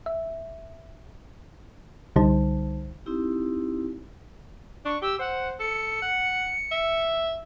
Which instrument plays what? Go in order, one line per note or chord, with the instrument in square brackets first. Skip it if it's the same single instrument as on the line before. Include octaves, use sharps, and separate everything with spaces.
[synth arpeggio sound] E5
C2 D3 G3 D#4 C5 A5
[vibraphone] C4 D#4 E4 G4
[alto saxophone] D4 [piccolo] C#6
[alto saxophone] G4 [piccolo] E6
[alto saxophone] C5 [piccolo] F#5
[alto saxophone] A4 [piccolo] C#7
[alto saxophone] F#5
E5